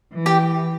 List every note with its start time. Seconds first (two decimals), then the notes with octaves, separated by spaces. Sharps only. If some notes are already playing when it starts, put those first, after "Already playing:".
0.13 E3
0.26 G4 G5